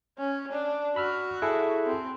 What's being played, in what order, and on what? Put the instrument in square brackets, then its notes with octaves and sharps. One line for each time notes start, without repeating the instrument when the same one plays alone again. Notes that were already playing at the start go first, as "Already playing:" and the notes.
[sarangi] C#4
D4
[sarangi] F#4 [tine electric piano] B5 E6 F6
[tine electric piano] E4 G#4 A4
[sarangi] C4